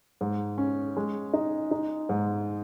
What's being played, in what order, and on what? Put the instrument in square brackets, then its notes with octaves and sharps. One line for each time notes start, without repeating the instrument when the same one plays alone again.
[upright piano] G#2
C#4
G#3
D#4
D#4
G#2